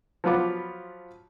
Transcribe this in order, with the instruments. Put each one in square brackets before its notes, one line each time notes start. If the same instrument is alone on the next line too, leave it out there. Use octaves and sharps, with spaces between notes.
[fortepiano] F3 F#3 B3 F4 B5 D6